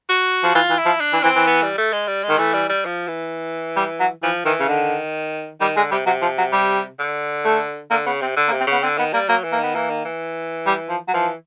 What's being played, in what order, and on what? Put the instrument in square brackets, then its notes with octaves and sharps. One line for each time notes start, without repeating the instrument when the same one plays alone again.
[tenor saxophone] F#4
[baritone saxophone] F3
[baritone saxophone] E3 [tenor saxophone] F4
[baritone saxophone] E3
[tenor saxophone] E4
[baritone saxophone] F3
[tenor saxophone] D4
[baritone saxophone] E3
[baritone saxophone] E3 [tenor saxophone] C4
[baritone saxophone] E3
[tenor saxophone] B3
G3
A3
G#3
G3
G#3
[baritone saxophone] D#3
[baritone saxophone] E3 [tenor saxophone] A3
[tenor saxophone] G3
G3
F3
E3
[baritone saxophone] G3
F#3
[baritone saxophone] E3 [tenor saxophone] F3
[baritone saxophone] D#3 [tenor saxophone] E3
[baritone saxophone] C#3
[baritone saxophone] D3 [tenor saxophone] D#3
[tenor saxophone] D#3 [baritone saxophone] G3
[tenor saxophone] D3 [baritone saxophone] G#3
[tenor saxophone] C3 [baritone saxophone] G3
[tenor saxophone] C3 [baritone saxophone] F#3
[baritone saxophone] F3
F#3
G3
[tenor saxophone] D3
[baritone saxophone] A3
[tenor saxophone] D3 [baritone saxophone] A#3
[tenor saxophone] C#3 [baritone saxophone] B3
[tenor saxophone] C3 [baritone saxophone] C4
[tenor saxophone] D3
[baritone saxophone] A#3
[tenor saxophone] C3
[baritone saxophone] C4
[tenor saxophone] C#3 [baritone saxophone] B3
[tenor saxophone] D3 [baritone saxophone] C4
[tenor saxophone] D#3 [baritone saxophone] B3
[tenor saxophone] G3 [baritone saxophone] A#3
[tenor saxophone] F#3 [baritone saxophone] A#3
[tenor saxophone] E3
[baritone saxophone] A#3
[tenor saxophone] D#3 [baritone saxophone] B3
[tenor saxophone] E3 [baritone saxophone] A#3
[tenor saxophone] D#3
E3
[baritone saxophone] G3
F3
F#3
[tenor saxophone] E3 [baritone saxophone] F3